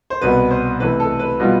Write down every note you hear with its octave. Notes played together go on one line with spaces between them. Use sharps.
C5
C2 B2 B3 B4
C5
C3 E3 A3 B4
A4
B4
B2 G3 B3 F4